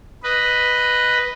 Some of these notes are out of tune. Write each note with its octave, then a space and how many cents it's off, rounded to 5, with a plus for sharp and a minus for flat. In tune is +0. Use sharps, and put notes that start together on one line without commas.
B4 +0 D#5 +0